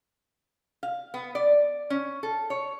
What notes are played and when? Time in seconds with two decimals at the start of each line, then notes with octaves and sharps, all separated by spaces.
0.83 F5
1.14 B3
1.35 D5
1.90 C#4
2.23 A4
2.50 C#5